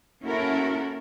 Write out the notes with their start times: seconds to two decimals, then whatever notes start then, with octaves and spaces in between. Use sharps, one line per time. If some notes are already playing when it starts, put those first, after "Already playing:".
0.22 A#3 C#4 E4 F#4 A4 A#4